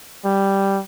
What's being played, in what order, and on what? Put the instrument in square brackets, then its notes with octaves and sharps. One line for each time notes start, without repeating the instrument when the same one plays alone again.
[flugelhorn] G3